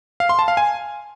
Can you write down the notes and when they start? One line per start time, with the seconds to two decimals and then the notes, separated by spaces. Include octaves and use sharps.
0.20 F5
0.29 C6
0.39 A5
0.48 F5
0.57 G#5